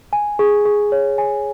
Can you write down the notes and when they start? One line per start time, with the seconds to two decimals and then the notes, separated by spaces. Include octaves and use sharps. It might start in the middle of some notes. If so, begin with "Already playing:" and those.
0.13 G#5
0.39 G#4
0.65 G#4
0.92 C#5
1.18 G#5